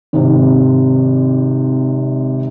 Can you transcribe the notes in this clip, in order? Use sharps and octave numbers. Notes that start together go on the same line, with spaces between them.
G#1 C3